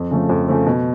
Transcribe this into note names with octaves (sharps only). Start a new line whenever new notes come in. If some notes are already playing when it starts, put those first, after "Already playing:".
Already playing: F2
C#3 F3 A3
F2
C#3 F3 A3
B2